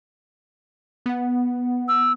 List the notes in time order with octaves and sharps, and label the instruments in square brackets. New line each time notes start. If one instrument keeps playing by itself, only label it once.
[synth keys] B3 F#5
[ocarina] E6